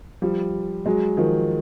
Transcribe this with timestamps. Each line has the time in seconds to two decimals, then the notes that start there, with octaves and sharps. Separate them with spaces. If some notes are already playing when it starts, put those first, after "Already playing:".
0.22 F3 G3
0.86 F#3 G#3
1.17 D#3 F3